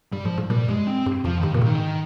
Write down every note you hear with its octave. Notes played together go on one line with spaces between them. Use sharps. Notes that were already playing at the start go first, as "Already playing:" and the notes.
G2 G3
G#2 F3
G#2
A#2 G3
G2 G#3
C4
G2
F2 F3
D#3
G2
A#2 C#3
G#2 D#3